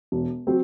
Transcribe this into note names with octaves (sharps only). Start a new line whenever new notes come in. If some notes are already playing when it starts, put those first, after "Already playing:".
E1
F#3 C4